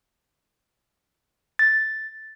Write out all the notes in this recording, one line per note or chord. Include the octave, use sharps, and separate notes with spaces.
A6